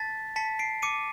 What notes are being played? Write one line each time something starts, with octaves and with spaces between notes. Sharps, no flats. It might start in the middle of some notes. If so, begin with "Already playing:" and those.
Already playing: A5 A6 B6
A5 B6 C#7
C7 D7
D6 C#7 D#7